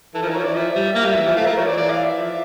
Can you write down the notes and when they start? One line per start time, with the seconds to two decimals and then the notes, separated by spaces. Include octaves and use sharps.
0.14 E3 A4
0.22 F3 A#4
0.29 E3
0.34 F3 C#5
0.44 E3 D5
0.55 F3 E5
0.75 G3
0.95 A#3
1.06 G3
1.15 E3
1.26 F3
1.36 A3 F5
1.46 A3 A#4
1.56 F3 C#5
1.67 E3 D5
1.77 D5
1.90 F5
2.04 E5
2.17 F3